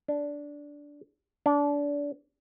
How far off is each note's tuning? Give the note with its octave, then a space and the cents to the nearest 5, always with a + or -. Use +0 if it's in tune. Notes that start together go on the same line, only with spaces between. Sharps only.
D4 -10
D4 -25